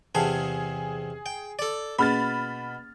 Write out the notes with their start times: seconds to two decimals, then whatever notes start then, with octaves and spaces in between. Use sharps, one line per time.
0.15 E2 C3 G#4 F5 A5
1.26 G5
1.59 A4 D5
1.99 B2 A#3 C#4 G#4 B5 F6 A6